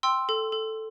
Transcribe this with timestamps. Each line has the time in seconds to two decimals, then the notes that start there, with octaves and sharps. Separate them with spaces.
0.03 G5 C6 E6
0.29 A4
0.52 A4